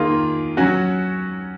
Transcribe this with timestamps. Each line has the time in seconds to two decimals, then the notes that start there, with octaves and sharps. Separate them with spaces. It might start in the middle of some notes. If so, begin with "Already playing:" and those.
Already playing: D#3 A#3 F4 G#4
0.57 F#3 C#4 F#4